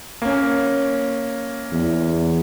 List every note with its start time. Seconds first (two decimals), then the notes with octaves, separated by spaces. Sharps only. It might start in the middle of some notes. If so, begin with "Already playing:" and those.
0.22 A#3 C#4
1.72 E2